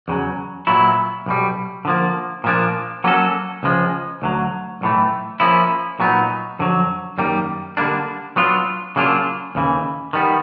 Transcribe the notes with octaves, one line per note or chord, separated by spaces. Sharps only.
E2 C#3 F#3
A#2 F#3 B3 E4
B1 B2 G3
D3 F3 A#3
A#2 F3 A#3 D4
F#3 A#3 C#4 F#4 A4
C#2 C#3 F3 G#3
D2 D3 F#3
B1 A2 E3 A3
F3 A#3 C#4 E4
A#2 F#3 B3 D#4
F2 D3 F#3
F#2 D#3 G3 A#3
D3 G3 A#3 D4
F#3 B3 D4 F4
C#3 F#3 A#3 D4 F4
D#2 C#3 E3
D#3 G3 B3